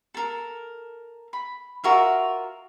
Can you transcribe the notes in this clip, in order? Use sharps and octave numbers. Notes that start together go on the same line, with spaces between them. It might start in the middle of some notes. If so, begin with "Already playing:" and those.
A4 A#4
B5
F4 F#4 A#4 E5